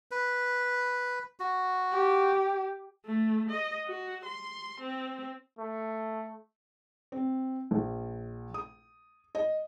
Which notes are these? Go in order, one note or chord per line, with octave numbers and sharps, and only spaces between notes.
B4
F#4
G4
A3
D#5
F#4
C6
C4
A3
C4
A#1
D#6
D#5